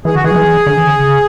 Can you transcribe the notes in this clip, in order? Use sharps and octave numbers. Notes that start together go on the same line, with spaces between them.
E3 G#4
D3 F#4
E3 G#4
F#3
E3
D3
E3
D3
C#3